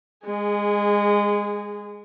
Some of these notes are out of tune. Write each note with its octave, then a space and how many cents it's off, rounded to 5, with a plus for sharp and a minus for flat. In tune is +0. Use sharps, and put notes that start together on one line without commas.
G#3 -20 G#4 +0